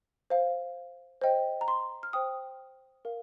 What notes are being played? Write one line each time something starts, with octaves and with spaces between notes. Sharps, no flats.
C5 F5
C5 D#5 G5
A#5
C6
F6
C5 G5 D#6
A#4 F5